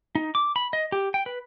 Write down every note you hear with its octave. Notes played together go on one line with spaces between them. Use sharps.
D#4
D6
B5
D#5
G4
G5
B4